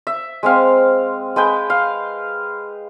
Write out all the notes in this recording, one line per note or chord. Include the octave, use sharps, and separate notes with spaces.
E5
G#3 C4 F5
G#3 B4 G5
F5